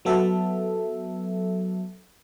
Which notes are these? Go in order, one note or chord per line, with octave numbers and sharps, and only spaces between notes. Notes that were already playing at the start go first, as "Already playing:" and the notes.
F#3 B3 A4 E5